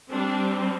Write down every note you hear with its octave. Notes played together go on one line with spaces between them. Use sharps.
G3 C4 D4